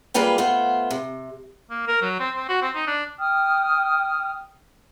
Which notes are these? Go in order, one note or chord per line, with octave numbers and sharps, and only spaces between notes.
G3 G#3 A#3 F4 B4 G5
A3 B3 F4 C5
C3
A#3
A#4
F#3
C4
C4
F#4
C4
D#4
D4
G5 D#6 F6